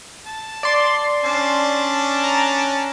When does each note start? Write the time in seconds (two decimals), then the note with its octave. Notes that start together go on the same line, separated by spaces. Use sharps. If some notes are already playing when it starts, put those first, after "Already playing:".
0.26 A5
0.63 D5 C6
1.24 C#4 D4 A5
2.24 A#5